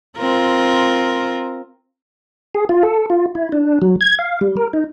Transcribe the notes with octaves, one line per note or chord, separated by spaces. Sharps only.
C4 F4 A#4
G#4
F4
A4
F4
E4
D4
F#3
G#6
F5
G3
A#4
D#4